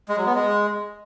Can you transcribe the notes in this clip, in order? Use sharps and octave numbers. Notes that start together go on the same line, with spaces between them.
G#3
F#3
B3
G#3